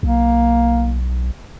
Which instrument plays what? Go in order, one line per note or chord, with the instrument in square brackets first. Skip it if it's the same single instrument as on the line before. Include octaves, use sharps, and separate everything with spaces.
[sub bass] B1 [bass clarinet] A#3